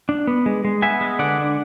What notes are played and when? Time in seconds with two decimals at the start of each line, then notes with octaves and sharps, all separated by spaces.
0.09 D4
0.27 B3
0.46 G#3
0.65 G#3
0.82 B3 E5 G#5
1.01 G#3
1.19 D3 D5 F#5
1.38 D4